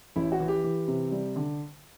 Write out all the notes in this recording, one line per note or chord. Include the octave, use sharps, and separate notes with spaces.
A1 E4
F#4
E3
G4
E3
C3
G3
D3